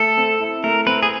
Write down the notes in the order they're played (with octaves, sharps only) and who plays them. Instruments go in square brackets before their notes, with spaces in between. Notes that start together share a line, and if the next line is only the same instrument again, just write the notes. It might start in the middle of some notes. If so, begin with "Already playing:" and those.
Already playing: [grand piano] A3 [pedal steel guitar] A4
[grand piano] C4
E4
[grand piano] A3 [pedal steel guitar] A#4
[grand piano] C4 [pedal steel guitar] B4
[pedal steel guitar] G#4